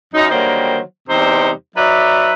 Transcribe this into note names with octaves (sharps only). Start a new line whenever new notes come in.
F#2 D#4
D3 D#3 F#3 G3 A#3 C5
E2 C3 G3 D#4 G4 C5
F#3 D#4 B4 D5 E5